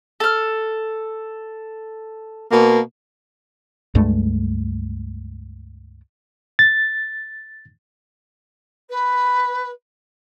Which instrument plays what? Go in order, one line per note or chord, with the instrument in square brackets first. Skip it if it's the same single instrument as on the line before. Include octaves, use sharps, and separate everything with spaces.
[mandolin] A4 F6
[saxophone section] B2 A#3
[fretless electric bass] C#2 G2 G#3 A3
[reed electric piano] A6
[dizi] B4